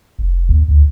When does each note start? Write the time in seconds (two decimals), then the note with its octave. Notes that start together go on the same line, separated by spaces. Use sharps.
0.19 F1
0.49 D#2
0.68 D2